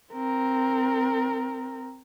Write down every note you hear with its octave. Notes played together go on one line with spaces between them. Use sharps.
C4 A#4